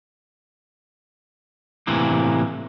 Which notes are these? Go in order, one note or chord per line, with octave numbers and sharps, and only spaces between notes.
A2 C3 E3 A#3